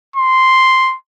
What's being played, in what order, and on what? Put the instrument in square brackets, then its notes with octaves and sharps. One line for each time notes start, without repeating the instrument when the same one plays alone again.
[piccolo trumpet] C6